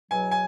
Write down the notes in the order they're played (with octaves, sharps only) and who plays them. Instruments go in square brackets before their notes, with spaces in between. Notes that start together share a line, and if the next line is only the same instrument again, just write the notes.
[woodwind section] E2 B2 F#3 [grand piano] G#5
[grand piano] G#5